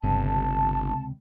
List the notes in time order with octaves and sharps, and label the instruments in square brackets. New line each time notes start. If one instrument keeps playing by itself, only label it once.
[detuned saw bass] G1 [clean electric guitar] C#2 C3 [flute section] A5